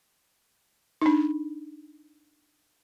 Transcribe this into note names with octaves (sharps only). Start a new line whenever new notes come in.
D4 D#4